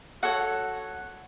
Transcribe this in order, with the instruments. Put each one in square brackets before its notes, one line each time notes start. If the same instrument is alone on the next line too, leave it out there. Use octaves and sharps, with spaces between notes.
[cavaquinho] F#4 A4 C#5 F#5